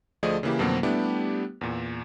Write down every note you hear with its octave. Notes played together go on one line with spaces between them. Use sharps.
D2 F3 A3 G#4 D5 D#5
C#3 E3 A#3 E4 G4
F2 B2 D3 F#3 A#3 C4
G3 A3 B3 D4 E4 G4
E2 A#2